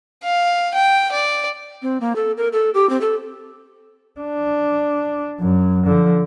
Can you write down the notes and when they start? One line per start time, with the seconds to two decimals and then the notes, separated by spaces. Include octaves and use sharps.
0.24 F5
0.74 G5
1.11 D5
1.82 C4
2.01 A#3
2.16 A4
2.37 A#4
2.53 A4
2.74 G4
2.90 C4
3.01 A4
4.20 D4
5.40 F#2
5.87 D3 F3